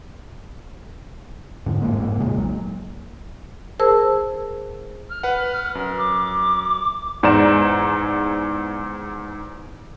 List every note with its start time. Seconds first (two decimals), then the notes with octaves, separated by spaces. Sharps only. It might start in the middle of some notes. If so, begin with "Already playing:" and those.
1.66 F2 G#2 D3
1.81 G#2 G#3 A#3
2.00 C2 F2 G#2 A#3
2.17 A#2 C#3 G#3
2.37 B1 F#3
3.80 G#4 A#4 C5 A5 E6
5.09 F6
5.23 B4 F#5
5.75 F#2
5.98 D6
7.23 E2 G#2 C5 D5 A#5 E7